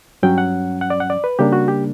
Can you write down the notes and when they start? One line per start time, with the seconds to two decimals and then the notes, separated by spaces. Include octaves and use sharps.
0.23 G2 F#3 C#4 G5
0.38 F#5
0.81 F#5
0.90 D5
1.00 F#5
1.10 D5
1.24 B4
1.39 C#3 G3 A#3 D4 G4
1.53 F#4
1.68 G4